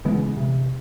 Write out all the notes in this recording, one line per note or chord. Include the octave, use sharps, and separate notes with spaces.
C#3 E3 G#3 B3
C3